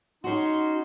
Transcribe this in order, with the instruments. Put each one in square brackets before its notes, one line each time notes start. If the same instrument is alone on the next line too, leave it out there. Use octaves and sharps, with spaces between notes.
[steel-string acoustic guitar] C#4 F#4 [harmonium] D#4 [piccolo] C6